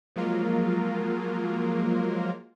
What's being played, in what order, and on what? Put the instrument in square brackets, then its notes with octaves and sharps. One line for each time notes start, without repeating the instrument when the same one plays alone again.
[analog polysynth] F3 F#3 G#3 A#3 F4 A#4